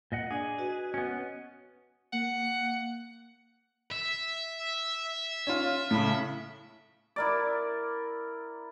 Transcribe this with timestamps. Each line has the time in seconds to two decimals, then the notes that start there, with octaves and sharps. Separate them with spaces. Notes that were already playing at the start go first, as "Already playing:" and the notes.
0.12 A#2 D#5 F#5
0.31 D4 G#4 D5
0.58 F#4 B4 D#5
0.94 B3 C#4
2.13 A#3 F#5
3.91 E5
5.47 C#4 F4
5.91 A2 C#3
7.16 E4 A#4 D5